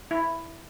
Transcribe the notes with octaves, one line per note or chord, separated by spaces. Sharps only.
E4